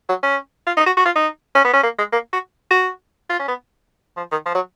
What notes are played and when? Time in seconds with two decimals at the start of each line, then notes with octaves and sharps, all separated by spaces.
0.09 F#3
0.23 C#4
0.67 F4
0.77 D#4
0.86 F#4
0.97 F#4
1.06 F4
1.16 D#4
1.55 C#4
1.64 B3
1.73 C#4
1.83 A#3
1.99 G#3
2.13 A#3
2.33 F#4
2.71 F#4
3.30 F4
3.39 C#4
3.48 B3
4.17 F3
4.32 D#3
4.46 F3
4.55 F#3